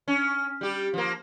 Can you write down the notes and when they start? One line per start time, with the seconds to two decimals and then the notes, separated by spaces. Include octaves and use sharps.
0.08 C#4
0.61 G3 G4
0.94 F3 A#3